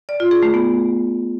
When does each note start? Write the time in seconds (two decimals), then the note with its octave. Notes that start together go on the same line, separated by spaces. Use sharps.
0.09 D5
0.20 F4
0.31 G#4
0.43 A3
0.54 B3